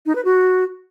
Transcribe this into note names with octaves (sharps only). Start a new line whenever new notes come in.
D#4
B4
F#4